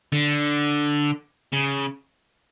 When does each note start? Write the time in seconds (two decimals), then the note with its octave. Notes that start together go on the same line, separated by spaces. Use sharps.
0.13 D3
1.53 C#3